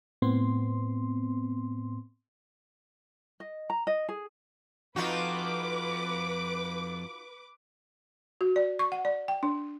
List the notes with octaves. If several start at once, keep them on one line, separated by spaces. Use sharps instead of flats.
A2 B3 C4 C6
D#5
A#5
D#5
G#4
F2 D#4 F4 F#4 B4 D6
F#4
D5
C#6
F#5
D5
G5
D4